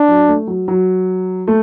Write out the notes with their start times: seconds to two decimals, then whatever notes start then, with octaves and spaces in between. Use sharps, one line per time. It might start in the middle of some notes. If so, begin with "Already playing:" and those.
Already playing: D4
0.08 F#3
0.28 A3
0.47 F#3
0.68 F#3
1.47 A3